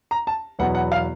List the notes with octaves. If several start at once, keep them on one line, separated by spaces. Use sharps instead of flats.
A#5
A5
E2 B2 F#3 B3 F#5
F#5
F5